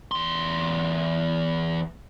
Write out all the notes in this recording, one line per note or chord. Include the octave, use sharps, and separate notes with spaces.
E2 C6